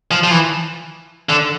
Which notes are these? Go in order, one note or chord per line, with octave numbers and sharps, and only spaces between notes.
F3
F3
E3
D3